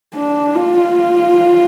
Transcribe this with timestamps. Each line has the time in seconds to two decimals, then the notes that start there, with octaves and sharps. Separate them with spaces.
0.16 D4
0.55 F4